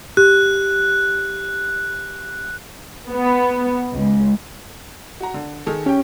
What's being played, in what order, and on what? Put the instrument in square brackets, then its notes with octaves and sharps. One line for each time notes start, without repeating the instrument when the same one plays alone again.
[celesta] G4 [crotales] F#6
[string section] B3
C#2
[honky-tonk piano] F#4 A#5
D3
D#3 G#4 A4
[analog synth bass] C#4 [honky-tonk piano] G4 G5